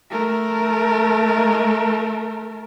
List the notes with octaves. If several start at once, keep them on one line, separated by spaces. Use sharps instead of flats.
A3 A#4